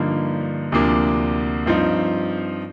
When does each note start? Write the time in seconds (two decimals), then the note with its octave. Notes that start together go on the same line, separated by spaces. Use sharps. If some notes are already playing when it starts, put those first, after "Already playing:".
Already playing: G2 D3 F3 A#3 D#4
0.72 D2 C3 F3 A#3 D4
1.66 G2 F3 C4 D#4